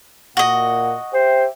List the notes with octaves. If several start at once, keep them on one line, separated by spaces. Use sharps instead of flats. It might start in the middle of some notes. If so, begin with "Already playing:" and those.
A#2 F#4 D#5 F#5
G4 C5 E5 G5